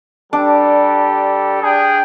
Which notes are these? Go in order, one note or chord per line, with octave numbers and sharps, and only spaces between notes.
G3 D4 G4 A4
D4 G#4 G5